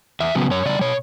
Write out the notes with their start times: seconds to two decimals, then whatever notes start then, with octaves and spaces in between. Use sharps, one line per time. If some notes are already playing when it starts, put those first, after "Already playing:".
0.20 E2 E5
0.35 C#3 F#3 B3
0.51 F#2 C#5
0.66 C#3 G3 D5
0.81 B2 C#5